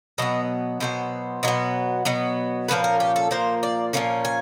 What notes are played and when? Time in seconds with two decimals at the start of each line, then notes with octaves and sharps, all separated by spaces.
0.18 B2 F#3 B3 D#5
0.80 B2 F#3 B3 C5
1.43 B2 F#3 B3
2.05 B2 F#3 B3
2.68 A#2 F3 A#3 C#4 B4
2.84 A#4
3.00 G4
3.16 A4
3.31 A#2 F3 A#3 C5
3.63 D5
3.93 A#2 F3 A#3 C#4
4.25 G#5